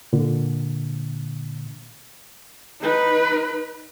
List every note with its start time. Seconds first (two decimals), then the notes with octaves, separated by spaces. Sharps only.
0.13 A#2 D3
2.80 D#4 B4